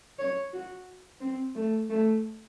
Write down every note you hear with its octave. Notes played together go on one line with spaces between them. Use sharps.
C#5
F#4
C4
A3
A3